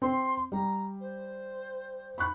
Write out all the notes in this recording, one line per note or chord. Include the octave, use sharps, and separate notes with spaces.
C4 C6
G3 A#5
C5
B5 C#6 F#6